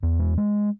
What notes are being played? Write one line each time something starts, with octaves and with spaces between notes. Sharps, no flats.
E2
G#3
G#3